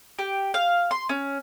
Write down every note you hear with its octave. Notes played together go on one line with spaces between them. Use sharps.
G4
F5
C6
C#4